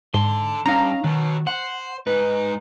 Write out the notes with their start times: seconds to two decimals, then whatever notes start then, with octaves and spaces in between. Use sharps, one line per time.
0.14 G#2 D3 A5 C6
0.66 G2 C#4 D#4 F5 A#5
1.04 B2 D#3 F#3
1.47 C5 F#5
2.07 G#2 D#4 B4